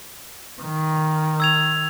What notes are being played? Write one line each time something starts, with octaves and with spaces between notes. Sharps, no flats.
D#3
E6 G#6 F7